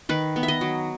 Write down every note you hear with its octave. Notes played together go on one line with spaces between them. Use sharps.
D#3 B4
B3
E5
D#5
F#3